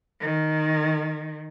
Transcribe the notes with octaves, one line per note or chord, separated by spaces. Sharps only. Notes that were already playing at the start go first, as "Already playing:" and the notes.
D#3